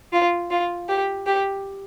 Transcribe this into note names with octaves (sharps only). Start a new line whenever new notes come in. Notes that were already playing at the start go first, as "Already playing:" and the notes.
F4
F4
G4
G4